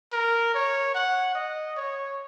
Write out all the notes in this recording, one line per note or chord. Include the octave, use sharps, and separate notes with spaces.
A#4
C#5
F#5
D#5
C#5